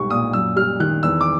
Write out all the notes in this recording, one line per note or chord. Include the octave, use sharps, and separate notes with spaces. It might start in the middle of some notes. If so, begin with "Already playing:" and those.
Already playing: B1 G#2 G3 C#6
A#2 D#6
F#2 E6
G3 F6
D#3 F#6
E2 E6
D6